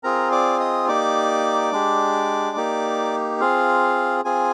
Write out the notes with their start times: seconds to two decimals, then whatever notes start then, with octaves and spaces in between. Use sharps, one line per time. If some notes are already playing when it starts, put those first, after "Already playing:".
0.03 C4 F4 G#4 A#4 A#5
0.32 D5 D6
0.59 D#5 D#6
0.88 A#3 D#4 G4 D5 D6
1.73 G#3 D4 G4
2.57 A#3 D#4 G4
3.41 C4 F4 G#4 F5
4.25 C4 F4 G#4 G#5